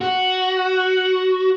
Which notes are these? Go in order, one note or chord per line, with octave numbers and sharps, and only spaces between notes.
F#4